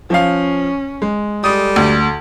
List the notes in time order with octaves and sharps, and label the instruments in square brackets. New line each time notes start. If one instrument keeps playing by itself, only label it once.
[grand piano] F3 F5 [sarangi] C#4
[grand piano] G#3
[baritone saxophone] G3 [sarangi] A4 [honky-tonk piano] D#6
[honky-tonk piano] D2